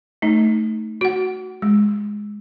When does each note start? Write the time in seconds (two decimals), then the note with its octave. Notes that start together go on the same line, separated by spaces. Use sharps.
0.22 A3 D#4
1.01 F#4 F#5
1.62 G#3